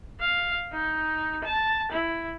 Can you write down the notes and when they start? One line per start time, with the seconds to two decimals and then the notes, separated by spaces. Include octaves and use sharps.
0.20 F5
0.73 D#4
1.44 A5
1.92 E4